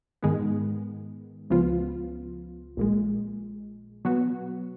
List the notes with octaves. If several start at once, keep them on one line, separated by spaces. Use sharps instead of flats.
G#2 D#3 G#3 B3
C#2 C#3 F3 B3 F4
A#1 A#2 G#3
B2 F#3 B3 F#4